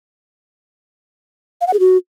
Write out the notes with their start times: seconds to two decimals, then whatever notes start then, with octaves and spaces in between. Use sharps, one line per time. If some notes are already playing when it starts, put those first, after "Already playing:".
1.61 F5
1.67 F#5
1.73 G#4
1.80 F#4